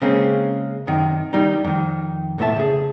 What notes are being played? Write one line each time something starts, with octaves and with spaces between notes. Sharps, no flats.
C#3 G#3 A#3 C4 C#4
F#2 C3 D#3
D#3 G3 D#4
F2 D#3
B1 A2 A3 A#4 E5 A5
C#3 G#4